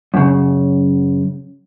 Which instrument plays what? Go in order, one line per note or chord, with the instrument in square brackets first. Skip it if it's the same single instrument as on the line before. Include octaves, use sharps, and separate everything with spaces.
[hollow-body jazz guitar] F#2 C#3